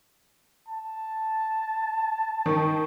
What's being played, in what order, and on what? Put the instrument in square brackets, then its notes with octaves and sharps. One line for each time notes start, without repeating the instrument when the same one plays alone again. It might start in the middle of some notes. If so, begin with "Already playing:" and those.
[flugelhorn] A5
[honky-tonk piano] D#3